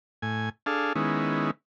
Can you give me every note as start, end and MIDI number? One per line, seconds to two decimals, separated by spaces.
0.22 0.49 45
0.22 0.49 80
0.66 0.93 62
0.66 0.93 68
0.66 0.93 69
0.66 0.93 77
0.95 1.51 51
0.95 1.51 56
0.95 1.51 59
0.95 1.51 61
0.95 1.51 64